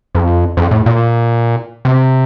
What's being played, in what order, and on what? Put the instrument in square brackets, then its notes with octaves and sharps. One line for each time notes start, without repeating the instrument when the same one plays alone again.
[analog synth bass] F2
F2
A2
A#2
C3